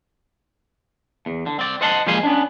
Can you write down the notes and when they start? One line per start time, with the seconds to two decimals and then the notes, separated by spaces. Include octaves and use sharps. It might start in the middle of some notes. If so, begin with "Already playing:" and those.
1.26 E2
1.46 D3
1.59 C4 D5
1.81 C5 D#5 F#5 A5 B5 C6
2.07 F3 G3 G#3 A#3 G#5 C6
2.23 B3 C#4 D4